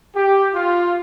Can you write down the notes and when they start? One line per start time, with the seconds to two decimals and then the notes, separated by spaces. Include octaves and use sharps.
0.15 G4
0.54 F4